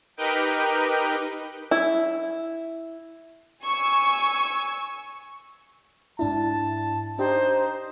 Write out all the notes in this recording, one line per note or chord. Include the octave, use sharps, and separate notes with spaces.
D#4 G4 A#4 B4 D#5 G5
E4
G#5 C#6 E6
G#2 D4 E4 A5
D4 D#4 G4 C5